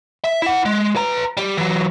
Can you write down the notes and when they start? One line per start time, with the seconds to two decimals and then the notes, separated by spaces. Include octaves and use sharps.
0.24 E5
0.42 E4 F#5
0.66 G#3
0.96 B4 A#5
1.37 G3 G4
1.57 E3 F#3